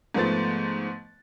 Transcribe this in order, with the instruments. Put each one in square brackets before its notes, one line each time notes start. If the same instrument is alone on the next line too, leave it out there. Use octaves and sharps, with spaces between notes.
[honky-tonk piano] G#2 F3 A3 B3 C5 A6